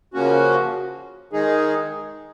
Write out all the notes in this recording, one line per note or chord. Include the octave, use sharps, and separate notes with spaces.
C#3 F3 A#3 C#4 F#4
D#3 G#3 D#4 G#4